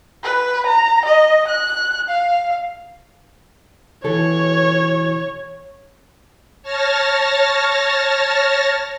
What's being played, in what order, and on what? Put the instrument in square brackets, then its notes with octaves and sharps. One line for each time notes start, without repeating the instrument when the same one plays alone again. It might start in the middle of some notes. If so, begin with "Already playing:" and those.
[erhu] B4
A#5
D#5
F#6
F5
[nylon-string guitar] B2 E3 A4 [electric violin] C#5
[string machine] C#5 A5 F6 A6 A#6